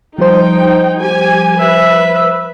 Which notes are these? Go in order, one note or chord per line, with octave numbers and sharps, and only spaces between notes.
F3 G3 D#4 C5 G5
G4 G#5
B4 E5